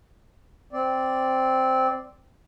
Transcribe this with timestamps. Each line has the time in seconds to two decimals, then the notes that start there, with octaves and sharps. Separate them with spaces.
0.73 C4 D5